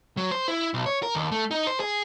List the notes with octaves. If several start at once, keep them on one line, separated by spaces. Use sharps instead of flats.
F#3
C5
E4
B1
C#5
A#4
D#2
A3
D#4
C5
G#4